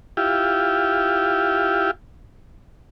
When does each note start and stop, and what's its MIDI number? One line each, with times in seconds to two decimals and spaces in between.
0.17 1.91 64
0.17 1.91 65
0.17 1.91 67